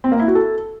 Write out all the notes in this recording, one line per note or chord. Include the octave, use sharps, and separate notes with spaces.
C4
A#3
E4
F#4
A4